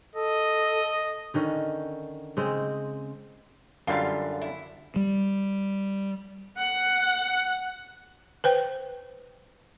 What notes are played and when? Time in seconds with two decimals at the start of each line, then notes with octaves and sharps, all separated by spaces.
0.15 A4 D#5
1.34 D3 D#3 C#4
2.37 C#3 G#3 C4
3.87 F#2 D3 G3 F4 F5
4.42 E4
4.96 G3
6.58 F#5
8.44 B4 C5 G5